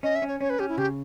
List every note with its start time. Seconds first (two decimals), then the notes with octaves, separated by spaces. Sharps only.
0.03 C#4 D#5
0.15 E5
0.22 C#4
0.28 C#5
0.40 C#4 C#5
0.50 B4
0.59 C#4 G4
0.69 E4
0.78 C#3 G4